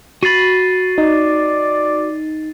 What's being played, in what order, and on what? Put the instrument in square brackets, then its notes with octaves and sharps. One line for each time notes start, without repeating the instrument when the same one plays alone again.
[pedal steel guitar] F#4 B5 [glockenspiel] A6 C7 D#7
[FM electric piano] D#4 [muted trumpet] D5